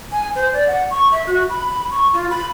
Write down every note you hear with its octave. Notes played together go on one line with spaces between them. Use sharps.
G#5
C5
D5
F#5
C#6
E5
F#4
B5
C#6
F4
B5